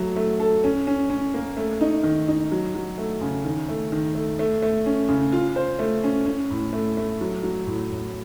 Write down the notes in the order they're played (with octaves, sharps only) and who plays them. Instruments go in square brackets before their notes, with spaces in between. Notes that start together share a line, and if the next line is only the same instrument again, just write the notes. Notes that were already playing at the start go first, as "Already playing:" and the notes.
Already playing: [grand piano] F#3 A3
A3
A4
C#4
C#4
C#4
A#3
A3
D#4
D#3
D#4
F#3
F#3
A3
C#3
D#3
A3
D#3
A3
A3
A3
C#4
C#3
F4
C5
A3
C#4
C#4
A2
A3
A3
F#3
F#3
A2
A2